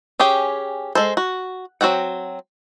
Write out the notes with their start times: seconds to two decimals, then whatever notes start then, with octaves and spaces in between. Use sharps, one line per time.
0.20 C#4 G4 G#4 G5
0.95 G#3 A4 C5
1.17 F#4
1.81 F#3 C4 F#4 F#5 G5